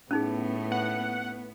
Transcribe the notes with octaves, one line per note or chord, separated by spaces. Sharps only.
A2 B3 C#4 D#4 G#4
F#5